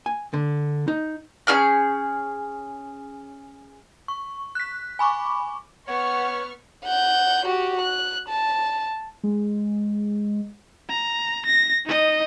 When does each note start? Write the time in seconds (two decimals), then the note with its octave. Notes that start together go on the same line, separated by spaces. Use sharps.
0.06 G#5
0.34 D3
0.88 D#4
1.47 C#4 G#4 F6 G6
4.08 C#6
4.55 F#6 B6
4.99 G#5 B5 C#6 D6
5.87 B3 C#5 F#5 C#6 F6
6.85 F#5 G6
7.46 F#4 G4
7.81 F#6
8.28 A5
9.23 G#3
10.90 A#5
11.46 A#6
11.86 D#4 D#5